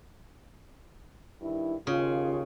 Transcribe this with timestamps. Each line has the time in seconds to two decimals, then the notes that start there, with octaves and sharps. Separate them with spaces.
1.42 G2 D#3 E4
1.87 D#2 C#3 F4